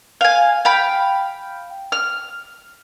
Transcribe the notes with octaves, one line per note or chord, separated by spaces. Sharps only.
F5 G#5
F5 G5 B5
F6